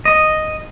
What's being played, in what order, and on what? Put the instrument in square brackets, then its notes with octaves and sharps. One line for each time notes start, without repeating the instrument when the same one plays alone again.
[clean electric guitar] D#5